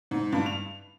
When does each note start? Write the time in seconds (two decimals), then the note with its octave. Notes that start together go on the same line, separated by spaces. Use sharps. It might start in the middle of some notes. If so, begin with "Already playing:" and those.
0.11 G#2
0.32 G2
0.46 F7